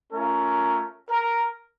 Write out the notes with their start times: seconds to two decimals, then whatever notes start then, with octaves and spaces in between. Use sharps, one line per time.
0.13 A3 C#4 F4 A#4
1.10 A#4